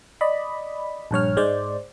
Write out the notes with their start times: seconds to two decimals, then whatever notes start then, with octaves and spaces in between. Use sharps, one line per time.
0.21 D5 D#5 B5
1.11 A#1 G2 C#5 F6
1.37 G#2 G#3 C5 D5